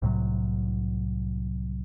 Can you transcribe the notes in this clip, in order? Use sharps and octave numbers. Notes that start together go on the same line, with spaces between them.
C2 A2 C3 F#3